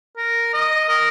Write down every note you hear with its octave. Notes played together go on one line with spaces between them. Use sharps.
A#4
D#5
A#4